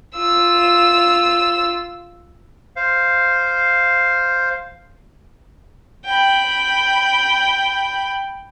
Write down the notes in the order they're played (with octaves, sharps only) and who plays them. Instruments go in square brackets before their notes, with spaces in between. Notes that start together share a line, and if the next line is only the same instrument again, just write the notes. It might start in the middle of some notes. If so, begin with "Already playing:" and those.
[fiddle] F4 E6
[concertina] C5 F5
[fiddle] G5 B5